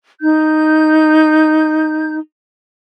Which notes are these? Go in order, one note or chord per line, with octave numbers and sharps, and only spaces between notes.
D#4 G6